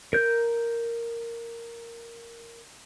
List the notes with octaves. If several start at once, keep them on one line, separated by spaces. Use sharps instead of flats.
A#4 G6